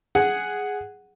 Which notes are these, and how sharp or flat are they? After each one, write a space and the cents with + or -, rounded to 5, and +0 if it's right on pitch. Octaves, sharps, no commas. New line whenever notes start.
G#4 +0 F#5 +0